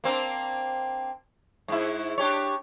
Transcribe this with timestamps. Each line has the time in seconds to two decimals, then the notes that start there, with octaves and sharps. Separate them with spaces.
0.04 A#3 C4 D4
1.68 G#2 E4
2.18 D4 G4 C#5